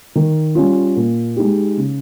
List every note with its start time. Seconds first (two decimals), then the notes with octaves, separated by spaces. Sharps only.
0.15 D#3
0.55 G3 C#4 F4
0.96 A#2
1.36 G#3 D#4 G4
1.77 C#3